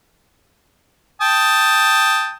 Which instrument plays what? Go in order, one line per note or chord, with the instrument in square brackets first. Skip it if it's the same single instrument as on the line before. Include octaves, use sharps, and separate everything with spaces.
[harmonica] G5 A5 D#6